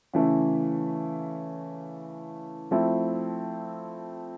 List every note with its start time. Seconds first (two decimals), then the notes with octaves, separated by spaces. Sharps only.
0.13 C#3 E3 A3
2.71 F3 A3 C4 E4